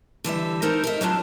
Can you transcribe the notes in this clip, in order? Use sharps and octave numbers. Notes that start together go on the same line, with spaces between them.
D3 E3 G3 E5
D#4 A4 A#4 C5
A#4 D#5 E5
F#3 C4 D4 F4